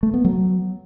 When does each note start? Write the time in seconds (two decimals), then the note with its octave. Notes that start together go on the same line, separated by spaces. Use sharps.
0.03 A3
0.14 B3
0.25 F#3